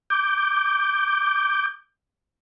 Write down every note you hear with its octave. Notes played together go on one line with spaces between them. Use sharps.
D6 G6